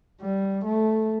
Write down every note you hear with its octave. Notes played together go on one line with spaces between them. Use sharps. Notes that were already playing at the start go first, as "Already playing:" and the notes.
G3
A3